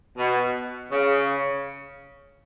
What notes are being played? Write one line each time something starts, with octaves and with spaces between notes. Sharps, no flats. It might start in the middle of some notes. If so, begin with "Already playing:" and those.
B2
C#3